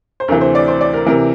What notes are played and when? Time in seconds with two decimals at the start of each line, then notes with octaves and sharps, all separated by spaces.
0.20 C5
0.28 D2 A#4
0.31 C3 E3
0.41 C5
0.55 D5
0.68 C5
0.81 D5
0.94 A#4
1.06 C3 E3 A#4